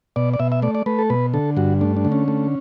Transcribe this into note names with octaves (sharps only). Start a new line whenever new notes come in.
B2 D5
D5
B2 E5
E5
A3 D5
D5
A3 B4
A4
B2 B4
D3 A4
G2 F#4
A3 D4
D4
D3
C#4
A3